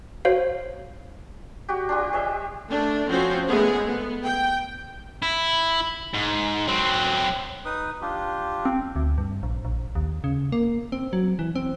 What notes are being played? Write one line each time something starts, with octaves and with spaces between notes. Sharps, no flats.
F#4 C5 C#5 F5
F#4 G4
D4 F4 G4
G4 C#5 D#5 E5
A3 D4
F3 C4 C#4 F#4 C5
G#3 A3 B3 G#4
B3
G5
E4
G#2
F#3 C4
D#4 B4 D#6
D4 F4 G4
C4
D2
G2
A#1
A#1
D#2
C#3
A#3
C4
F#3
E3
C4